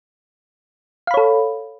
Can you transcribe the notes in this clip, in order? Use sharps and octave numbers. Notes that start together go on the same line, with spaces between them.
A4 C#5 F5 B5